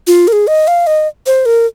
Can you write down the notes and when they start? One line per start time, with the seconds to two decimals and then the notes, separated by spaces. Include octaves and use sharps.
0.07 F4
0.27 A#4
0.32 G#4
0.47 D#5
0.67 F5
0.87 D#5
1.26 C5
1.45 A#4